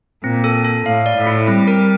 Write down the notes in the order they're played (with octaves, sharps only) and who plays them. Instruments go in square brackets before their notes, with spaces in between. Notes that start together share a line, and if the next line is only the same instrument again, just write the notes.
[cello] A#2 [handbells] C4
[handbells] A4
A4
[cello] A2 [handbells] F5
[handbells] D5
[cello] A2
[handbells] E4
[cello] G3 [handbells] C4
[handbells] A#4